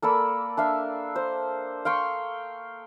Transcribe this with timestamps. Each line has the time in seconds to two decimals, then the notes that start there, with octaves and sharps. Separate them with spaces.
0.02 A#3 A4 D5 B5
0.57 D4 E5 F5
1.16 C5
1.85 F5 G5 C6 C#6